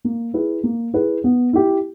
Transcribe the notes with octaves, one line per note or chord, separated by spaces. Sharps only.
A#3
E4 G#4 B4
A#3
E4 G#4 B4
B3
E4 G4